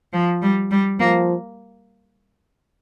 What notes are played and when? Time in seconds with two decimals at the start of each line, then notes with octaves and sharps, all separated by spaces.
0.13 F3
0.42 G3
0.71 G3
1.00 F3 A#3